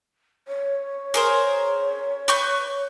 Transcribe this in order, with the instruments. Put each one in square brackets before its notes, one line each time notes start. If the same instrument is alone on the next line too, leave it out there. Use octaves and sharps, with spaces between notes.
[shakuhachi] C#5
[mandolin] G#4 A#4 C5
B4 C#6 G6